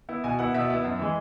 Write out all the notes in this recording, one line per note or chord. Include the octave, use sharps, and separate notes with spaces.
B3 E4
B2 G#5
B3 E4 F#5
B2 E5
B3 E4
F#2
E3 G#3